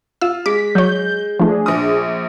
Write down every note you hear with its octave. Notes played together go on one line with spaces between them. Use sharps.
F4 E6
G#3 D6 B6
F#3 C#5 G6
F3 A3 D4 G#4
A#1 D#6